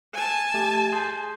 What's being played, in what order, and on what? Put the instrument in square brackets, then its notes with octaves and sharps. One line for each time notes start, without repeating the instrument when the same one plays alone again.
[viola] G#5 A5
[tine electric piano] A3 G4
G#4 C6 G6